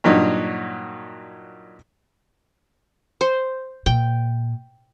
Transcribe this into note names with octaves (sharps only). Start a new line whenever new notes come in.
G2 A#2 F#3 D#4
C5
A#2 G5